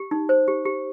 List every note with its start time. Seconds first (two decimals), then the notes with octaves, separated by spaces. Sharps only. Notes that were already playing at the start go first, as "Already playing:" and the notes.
Already playing: G4
0.11 D#4
0.29 C5
0.48 G4
0.65 G4